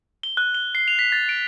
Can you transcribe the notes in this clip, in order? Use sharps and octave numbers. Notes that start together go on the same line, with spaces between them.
G7
F#6
G7
C7
F7
B6
A6
D7